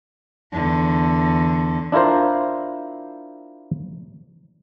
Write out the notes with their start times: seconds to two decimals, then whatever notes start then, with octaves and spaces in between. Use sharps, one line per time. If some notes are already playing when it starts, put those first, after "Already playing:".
0.52 E2 D3
1.92 D4 E4 F4 A#4 C5